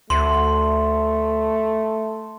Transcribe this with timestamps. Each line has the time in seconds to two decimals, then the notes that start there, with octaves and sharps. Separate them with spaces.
0.10 D2 A3 C6